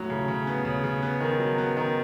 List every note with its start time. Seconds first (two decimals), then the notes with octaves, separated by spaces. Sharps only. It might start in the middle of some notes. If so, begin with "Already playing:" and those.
Already playing: A2 F#3
0.10 C#3
0.28 C#3
0.47 B3
0.65 C#3
0.84 C#3
1.02 B3
1.20 D#3
1.39 F#3
1.58 B3
1.77 D#3